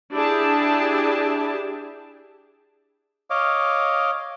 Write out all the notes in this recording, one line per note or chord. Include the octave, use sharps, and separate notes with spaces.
D4 E4 G4 G#4 A5
C#5 D#5 F5 D6